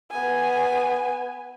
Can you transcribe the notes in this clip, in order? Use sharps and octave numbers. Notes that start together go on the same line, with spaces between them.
B3 G#5